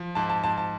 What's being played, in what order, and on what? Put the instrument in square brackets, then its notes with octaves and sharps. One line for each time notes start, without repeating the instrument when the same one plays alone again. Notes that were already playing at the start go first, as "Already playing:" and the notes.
Already playing: [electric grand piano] F3
[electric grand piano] G#2 [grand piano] A5
[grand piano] A5
[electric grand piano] G#2 [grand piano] A5
[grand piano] A5